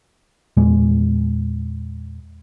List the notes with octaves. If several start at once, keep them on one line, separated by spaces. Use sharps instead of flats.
E2 A#2 G#3